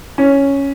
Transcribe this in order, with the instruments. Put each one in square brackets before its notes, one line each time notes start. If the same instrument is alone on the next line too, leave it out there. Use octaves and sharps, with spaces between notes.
[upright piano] C#4